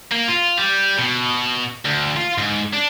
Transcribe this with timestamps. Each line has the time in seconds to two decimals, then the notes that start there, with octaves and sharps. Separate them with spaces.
0.12 A#3
0.28 F4
0.58 G3
0.99 B2
1.85 D2
2.17 F4
2.38 G#2
2.73 D4